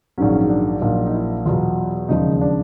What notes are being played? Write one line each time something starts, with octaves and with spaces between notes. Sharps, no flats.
A#1 G#2 D#3 F#3 C#4
D4
A#1 A#2 F#3 D#4
D#4
E4
E2 B2 F#3 F4
E1 D#2 C#3 F3 D#4
D4